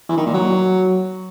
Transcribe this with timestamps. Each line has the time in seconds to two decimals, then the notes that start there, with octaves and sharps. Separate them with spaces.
0.09 E3
0.17 D#3
0.26 A#2
0.34 F#3